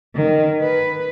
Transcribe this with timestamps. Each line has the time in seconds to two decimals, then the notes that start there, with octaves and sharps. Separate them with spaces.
0.16 D#3
0.62 B4